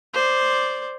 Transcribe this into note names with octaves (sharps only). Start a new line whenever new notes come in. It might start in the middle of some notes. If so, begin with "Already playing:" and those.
C5 D5